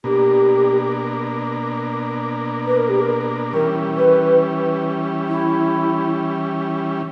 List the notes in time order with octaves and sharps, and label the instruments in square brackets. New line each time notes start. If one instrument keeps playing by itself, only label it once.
[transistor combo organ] B2 A#3 D4 [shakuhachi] G4
[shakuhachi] B4
A#4
G4
A#4
[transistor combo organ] E3 G3 C#4 [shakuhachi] A#4
[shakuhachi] B4
E4